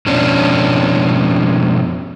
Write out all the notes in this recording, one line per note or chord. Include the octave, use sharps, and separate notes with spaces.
F2 B2 C#4 D4